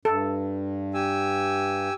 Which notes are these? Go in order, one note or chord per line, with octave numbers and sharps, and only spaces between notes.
G2 A4
G4 G#5 E6